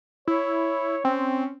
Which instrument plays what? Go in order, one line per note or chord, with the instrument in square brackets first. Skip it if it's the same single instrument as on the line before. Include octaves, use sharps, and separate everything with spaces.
[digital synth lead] E4 [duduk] C#5
[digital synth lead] C4 [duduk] C#4